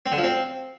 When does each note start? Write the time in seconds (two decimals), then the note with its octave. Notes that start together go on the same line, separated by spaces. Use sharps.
0.06 C4
0.12 D3
0.18 F3
0.24 C4